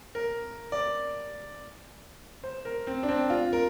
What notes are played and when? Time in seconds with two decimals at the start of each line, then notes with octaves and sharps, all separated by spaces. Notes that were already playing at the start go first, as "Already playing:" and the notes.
0.15 A#4
0.72 D5
2.44 C5
2.65 A#4
2.87 C4
3.03 D4
3.09 C4
3.30 F4
3.53 A#4